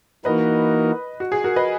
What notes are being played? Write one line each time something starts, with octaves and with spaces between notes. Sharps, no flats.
E3 A#3 D#4 F#4 A#4 B4 D#5
F#4
G#4
F#4 A#4
B4 D#5